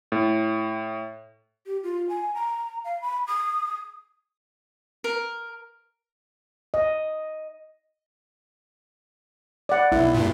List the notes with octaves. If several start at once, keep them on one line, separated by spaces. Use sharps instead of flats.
A2
G4
F4
G#5
A#5
F5
B5
D#6
A#4
D#5
D5 F#5
B1 E4
G2 A#2